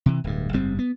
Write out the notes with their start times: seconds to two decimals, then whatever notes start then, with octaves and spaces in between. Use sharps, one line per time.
0.06 C3 E3
0.24 D1 G2
0.53 F#1 G#2 G3 C4
0.79 B3